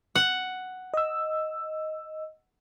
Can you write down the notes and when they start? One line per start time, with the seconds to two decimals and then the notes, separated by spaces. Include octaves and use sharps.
0.15 F#5
0.94 D#5 E6